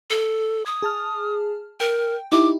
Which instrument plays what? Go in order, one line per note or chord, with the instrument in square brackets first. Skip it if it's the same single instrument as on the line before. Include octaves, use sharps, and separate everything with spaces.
[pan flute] A4
[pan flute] D#6 [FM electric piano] G#6
[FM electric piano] G#4 A5 F6
[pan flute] A#4 [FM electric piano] G5
[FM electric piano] D#4 E4 G4 [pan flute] D6